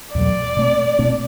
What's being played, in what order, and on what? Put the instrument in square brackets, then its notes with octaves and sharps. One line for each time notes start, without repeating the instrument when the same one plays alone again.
[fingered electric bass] E2 B2 F#3 A3 [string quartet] D5
[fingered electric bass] B2 A3 C4
B2 A3 C4